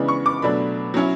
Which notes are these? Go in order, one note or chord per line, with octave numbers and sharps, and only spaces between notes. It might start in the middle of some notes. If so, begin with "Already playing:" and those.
Already playing: C#3 E3 G#3 B3 D4 B5
C#6
D6
B2 F#3 A3 D4 B5
F#3 C#4 E4